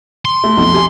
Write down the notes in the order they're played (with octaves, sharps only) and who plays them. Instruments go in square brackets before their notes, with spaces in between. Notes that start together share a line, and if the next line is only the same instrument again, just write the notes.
[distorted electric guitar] C6
[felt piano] A3
B1 F2
G4 G#5